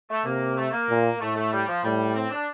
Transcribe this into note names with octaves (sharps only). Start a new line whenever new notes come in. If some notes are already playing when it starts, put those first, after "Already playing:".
A3
C3 A#3
A3
A#3
A#2
A2 A3
A3
G3
F3
A2 G3
C4
D4